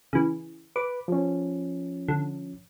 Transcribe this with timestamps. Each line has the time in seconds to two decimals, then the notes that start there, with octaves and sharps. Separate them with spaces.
0.13 C#3 E3
0.76 B4 D6
1.08 F3 C#4
2.08 D3